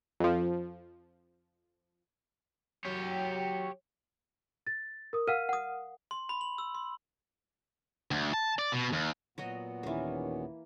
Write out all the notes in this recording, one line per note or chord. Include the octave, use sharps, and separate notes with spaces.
F2 F3
F#3 G4 C#5
A6
A#4 D#6
A#4 F5 F#5 F6 D#7
F#5 D#6
C6
B5
F#7
E6
C6
D2
A5
D5
B2
D#2
A#2 F#3 B3 F#4 D#5
D#2 D#3 E3 A#3 C#4